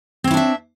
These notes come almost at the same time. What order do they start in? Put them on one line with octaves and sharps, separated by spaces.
C4 C#5 E4 D4 E5